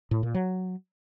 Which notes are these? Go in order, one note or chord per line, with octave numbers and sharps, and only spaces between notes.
A2
A#2
F#3